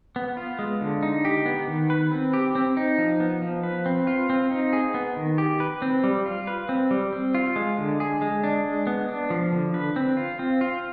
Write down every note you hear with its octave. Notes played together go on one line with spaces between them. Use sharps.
B3
F4
G#3
D3
D#4
G4
B3
D#3
B4
C4
G4
C4
D#4
F3
B3
F3
B4
C4
F4
C4
D#4
G#4
B3
D#3
G4
B4
C4
G3
F4
B4
C4
G3
C4
F4
G#3
D3
G#4
G#3
D4
G#3
B3
D4
F3
D3
B4
C4
F4
C4
F4